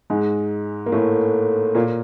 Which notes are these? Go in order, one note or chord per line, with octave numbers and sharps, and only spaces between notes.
G#2 G#3
A#3
A2 A3
A#2 A#3